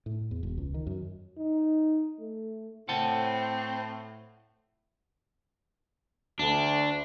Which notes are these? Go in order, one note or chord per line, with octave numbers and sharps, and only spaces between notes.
A2
E2
E1
C#2
D#3
F#2
D#4
A3
A2 C4 F#5 A5
D2 D4